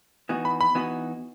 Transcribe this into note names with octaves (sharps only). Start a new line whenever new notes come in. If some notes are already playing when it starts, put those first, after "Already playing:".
E3 B3 D#4 F#4
B5
B5
E3 B3 D#4 F#4